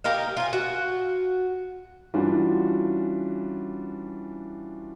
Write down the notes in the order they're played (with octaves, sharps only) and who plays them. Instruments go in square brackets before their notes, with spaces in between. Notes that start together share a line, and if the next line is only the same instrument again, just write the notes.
[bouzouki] G4 A#4 D#5 F5
F4 G#5
F#4
[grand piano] E3 G3 C#4 D4 F4 F#4